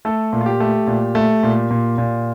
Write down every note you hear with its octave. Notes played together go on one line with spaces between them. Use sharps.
A3 A4
A#2
F4
G4
A3
A#2
A3
A#2
A#2
A#2